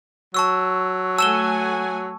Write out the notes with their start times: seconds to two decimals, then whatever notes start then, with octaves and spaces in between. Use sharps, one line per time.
0.34 F#3 A5 C#6 E6
1.18 A3 F#5 G#5 A5 E6 E7 G7